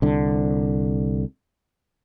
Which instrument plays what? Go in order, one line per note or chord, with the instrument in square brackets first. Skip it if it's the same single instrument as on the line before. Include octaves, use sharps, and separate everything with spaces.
[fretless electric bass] C2 D3